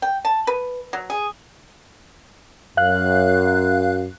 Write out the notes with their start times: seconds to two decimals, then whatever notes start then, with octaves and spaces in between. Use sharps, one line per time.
0.02 G5
0.25 A5
0.47 B4
0.93 F#3
1.10 G#4
2.77 F#2 F5 F#6